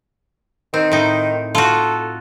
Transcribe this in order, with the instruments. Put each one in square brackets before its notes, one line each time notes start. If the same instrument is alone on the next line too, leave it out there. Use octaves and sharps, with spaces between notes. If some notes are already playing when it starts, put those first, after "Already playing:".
[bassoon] D#3 [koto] C4
[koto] A2 D#4
[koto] F4 F#4 [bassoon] A4